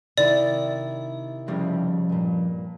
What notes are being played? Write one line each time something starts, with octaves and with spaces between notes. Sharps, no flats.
C3 D#3 E4 D5
F2 C#3 G3
G2 A#2